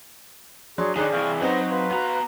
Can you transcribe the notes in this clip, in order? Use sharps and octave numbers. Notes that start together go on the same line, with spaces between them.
F#3 D4 G#4 D5 C6 C#6
D3 D#3 D#4 G#4 C#5 D5 F#6
C3 E3 F5 C#6 F6
F#3 C4 D#4 B4 C5 D#5 F#5
B4 F5 C6
B3 F#4 A#5